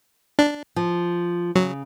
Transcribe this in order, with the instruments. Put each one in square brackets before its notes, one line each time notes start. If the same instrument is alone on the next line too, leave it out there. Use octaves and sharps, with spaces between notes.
[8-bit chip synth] D4
[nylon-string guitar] F3
[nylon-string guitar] C#3 [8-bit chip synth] F#3